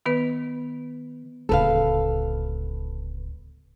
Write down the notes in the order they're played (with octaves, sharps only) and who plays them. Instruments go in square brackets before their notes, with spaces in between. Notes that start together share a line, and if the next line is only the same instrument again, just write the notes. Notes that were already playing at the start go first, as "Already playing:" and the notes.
[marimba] D#3 B3 B4
[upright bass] D1 C#2 [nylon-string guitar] A4 B4 F5